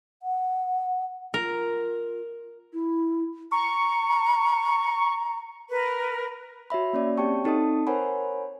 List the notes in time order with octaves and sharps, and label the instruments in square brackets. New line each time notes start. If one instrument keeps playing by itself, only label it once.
[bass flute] F#5
[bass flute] F4 [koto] A#4
[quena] E4
[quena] A#5 [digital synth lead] C#6
[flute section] A#4 B4
[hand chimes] F#4 C#5 E5 B5
A#3 C#4 D5
C4 G4 C#5 G5 A5 C#6
C4 D#4 A4 D#5 A5 D#6
A#4 C5 C#5 F#5 G#5 B5